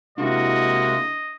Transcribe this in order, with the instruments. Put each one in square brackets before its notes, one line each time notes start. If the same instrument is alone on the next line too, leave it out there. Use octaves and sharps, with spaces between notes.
[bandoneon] C3 G#3 A#3 [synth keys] D4 E4 [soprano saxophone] F#4 [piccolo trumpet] D#5